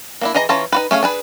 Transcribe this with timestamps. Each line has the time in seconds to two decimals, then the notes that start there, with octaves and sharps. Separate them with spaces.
0.21 A#3 D4 E4
0.35 E3 G#4 D#5 A#5
0.49 E3 C#4 F4 A5 A#5
0.72 D#4 F#4 B4
0.91 A3 C#4 G#4 F5
1.03 D4 G#4 B4